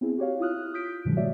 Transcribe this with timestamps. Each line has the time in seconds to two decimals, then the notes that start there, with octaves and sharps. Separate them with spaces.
0.01 B3 C4 E4 G#4
0.18 F#4 G4 C#5 F5
0.40 E4 F4 D#6 F6 F#6
0.74 D#6 G6 B6 D7
1.05 G2 B2 D#3 F3 F#3 G#3
1.17 G3 A3 F#4 C#5 D5 E5